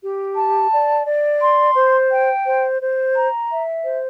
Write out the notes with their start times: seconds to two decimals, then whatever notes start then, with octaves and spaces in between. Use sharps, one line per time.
0.02 G4
0.37 A5
0.72 D5
1.06 D5
1.41 C6
1.76 C5
2.11 G5
2.45 C5
2.81 C5
3.15 A#5
3.50 E5
3.84 C5